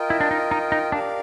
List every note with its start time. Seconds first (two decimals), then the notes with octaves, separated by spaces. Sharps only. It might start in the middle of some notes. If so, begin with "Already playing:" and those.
Already playing: F4 A#4 D#5 G5
0.10 E4
0.20 D4
0.31 D#4
0.51 D#4
0.72 D#4
0.92 D4 G4 A#4 D5 F5